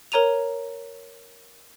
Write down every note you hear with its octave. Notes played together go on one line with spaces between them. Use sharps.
A#4 C#5 A#5 D#7 F7